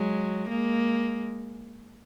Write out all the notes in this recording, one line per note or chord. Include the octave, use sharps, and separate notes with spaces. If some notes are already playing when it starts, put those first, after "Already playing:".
Already playing: F#3 G#3
G#3 A#3